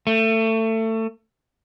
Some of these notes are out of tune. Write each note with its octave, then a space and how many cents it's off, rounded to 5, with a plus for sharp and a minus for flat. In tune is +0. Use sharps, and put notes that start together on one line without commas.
A3 +25